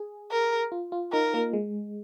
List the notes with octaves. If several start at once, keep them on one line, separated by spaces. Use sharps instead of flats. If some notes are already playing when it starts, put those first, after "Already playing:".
Already playing: G#4
A#4
F4
F4
D#4 A#4
A#3
G#3